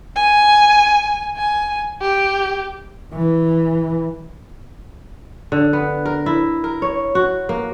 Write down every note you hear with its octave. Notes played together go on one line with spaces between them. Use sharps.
G#5
G#5
G4
E3
D3
B3
A#4
E4
A#4
C#5
F#4
A#3